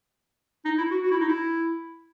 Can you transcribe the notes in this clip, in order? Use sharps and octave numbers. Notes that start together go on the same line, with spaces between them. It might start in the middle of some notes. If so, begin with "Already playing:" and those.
D#4
E4
F#4
F#4
E4
D#4
E4